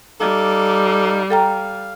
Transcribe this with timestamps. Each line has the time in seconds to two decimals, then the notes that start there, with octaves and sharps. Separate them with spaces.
0.20 G3 D#4 A4 F5 D6
1.30 A4 F5 G5 A#5